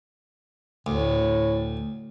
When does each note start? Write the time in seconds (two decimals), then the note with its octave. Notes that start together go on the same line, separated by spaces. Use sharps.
0.86 D2 A2